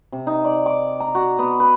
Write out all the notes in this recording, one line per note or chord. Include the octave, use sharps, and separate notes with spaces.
C3
D#4
D5
D6
A#5
F#4
B3
B4